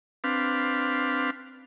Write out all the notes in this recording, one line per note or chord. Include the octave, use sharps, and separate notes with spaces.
C4 D4 B4 F5